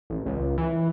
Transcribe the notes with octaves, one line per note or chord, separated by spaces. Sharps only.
A1
C#2
E3